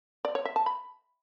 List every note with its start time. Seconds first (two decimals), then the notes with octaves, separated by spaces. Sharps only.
0.25 D5
0.35 C#5
0.45 E5
0.56 A5
0.66 B5